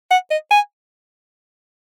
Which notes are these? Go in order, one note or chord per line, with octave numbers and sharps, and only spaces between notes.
F#5
D#5
G#5